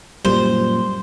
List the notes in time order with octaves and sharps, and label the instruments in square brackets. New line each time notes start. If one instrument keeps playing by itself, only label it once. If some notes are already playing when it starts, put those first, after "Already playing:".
[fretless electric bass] F#2 A#2 [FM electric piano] G3 [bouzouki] C5